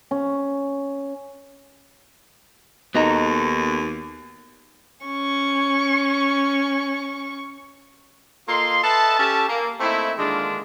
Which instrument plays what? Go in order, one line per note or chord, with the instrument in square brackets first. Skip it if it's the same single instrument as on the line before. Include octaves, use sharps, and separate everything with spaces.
[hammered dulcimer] C#4
[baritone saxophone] D#2 [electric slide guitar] B3 D#4 A4 [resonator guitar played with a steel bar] F#4 D#5 A#5
[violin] C#4 C#6
[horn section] A#3 F4 A4 D#5 C6
A4 B4 D#5 E5 A5
C#4 G4 A4 A5
A#3
A3 A#3 C4 D#4 E4
D3 D#3 G#3 A#3 D4 F4